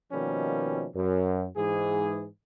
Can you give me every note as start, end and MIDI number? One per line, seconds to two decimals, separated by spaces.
0.11 0.87 47
0.11 0.87 51
0.11 0.87 53
0.11 0.87 55
0.11 0.87 58
0.11 0.87 61
0.95 1.46 42
1.56 2.27 44
1.56 2.27 52
1.56 2.27 68